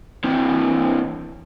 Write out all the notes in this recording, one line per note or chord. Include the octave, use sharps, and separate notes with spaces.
C3 E3